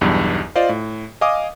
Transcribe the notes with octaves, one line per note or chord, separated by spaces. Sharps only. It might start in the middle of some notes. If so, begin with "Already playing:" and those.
B1 E2 G2
F4 C5 D5 D#5 F5
A2
D#5 F5 G#5 D6 D#6